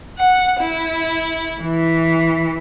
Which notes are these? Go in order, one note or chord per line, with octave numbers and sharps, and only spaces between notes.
F#5
E4
E3